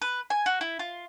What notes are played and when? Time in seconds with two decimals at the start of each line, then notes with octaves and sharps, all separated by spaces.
0.02 B4
0.30 G#5
0.46 F#4
0.61 E4
0.79 F4